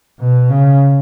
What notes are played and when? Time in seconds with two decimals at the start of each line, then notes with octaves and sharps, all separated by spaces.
0.19 B2
0.50 C#3